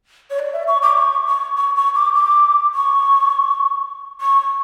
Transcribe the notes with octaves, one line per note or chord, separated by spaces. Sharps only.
C#5
D5
E5
C#6
D6
C#6
C#6
C#6
C#6
D6
D6
C#6
C#6